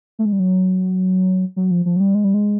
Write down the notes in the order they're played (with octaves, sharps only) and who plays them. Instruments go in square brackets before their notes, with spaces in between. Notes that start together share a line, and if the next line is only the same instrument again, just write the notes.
[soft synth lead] A3
G#3
G3
F#3
F#3
F3
F3
F#3
G3
G#3
G3
G#3